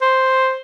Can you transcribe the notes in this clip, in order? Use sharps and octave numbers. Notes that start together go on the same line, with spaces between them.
C5